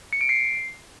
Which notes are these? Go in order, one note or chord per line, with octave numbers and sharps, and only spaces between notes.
C#7
D7
C7